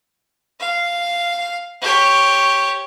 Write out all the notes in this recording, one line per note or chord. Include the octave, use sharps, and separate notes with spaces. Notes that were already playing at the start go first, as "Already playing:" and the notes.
F5
G4 C#5